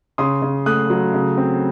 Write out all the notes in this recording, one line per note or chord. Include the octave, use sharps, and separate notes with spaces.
C#3 C6 D#6
C#3
A3 D#6 F#6
F#3
C#3
C4